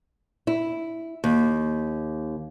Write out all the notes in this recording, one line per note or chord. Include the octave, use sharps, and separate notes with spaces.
E4
D#2